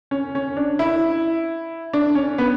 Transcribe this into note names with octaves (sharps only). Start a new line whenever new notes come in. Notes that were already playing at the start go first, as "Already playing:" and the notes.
C#4
C#4
D4
E4
D4
C#4
B3